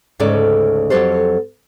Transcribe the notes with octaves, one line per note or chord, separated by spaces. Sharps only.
D2 G#2 C#3 C#4 A4 D5
F2 C#3 F#3 G4 A4 C5